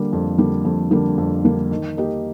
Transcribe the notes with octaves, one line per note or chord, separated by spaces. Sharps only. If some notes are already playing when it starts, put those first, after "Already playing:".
Already playing: D3 G3 A#3
F2
D3 G3 A#3
F2
D3 G3 A#3
F2
D3 G3 A#3
D#3
A#3 D#4 G4